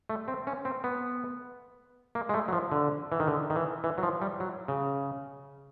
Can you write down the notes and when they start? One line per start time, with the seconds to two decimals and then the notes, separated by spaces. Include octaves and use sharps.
0.10 A3
0.28 C4
0.47 C#4
0.65 C4
0.84 B3
2.15 A#3
2.29 G#3
2.34 A3
2.48 F#3
2.53 F3
2.72 D3
3.12 E3
3.20 D#3
3.28 D3
3.50 D#3
3.56 E3
3.84 E3
3.98 F#3
4.03 F3
4.22 G3
4.40 F#3
4.68 C#3